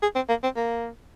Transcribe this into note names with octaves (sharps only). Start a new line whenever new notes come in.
G#4
C4
A#3
C4
A#3